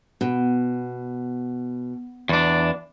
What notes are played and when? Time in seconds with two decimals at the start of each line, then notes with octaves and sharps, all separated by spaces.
0.21 B2
2.29 E2 D4